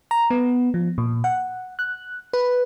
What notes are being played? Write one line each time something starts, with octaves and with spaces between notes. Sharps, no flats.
A#5
B3
F3
A#2
F#5
F#6
B4